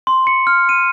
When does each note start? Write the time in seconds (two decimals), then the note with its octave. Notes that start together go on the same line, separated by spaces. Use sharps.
0.07 C6
0.27 C#7
0.47 F6
0.69 D#7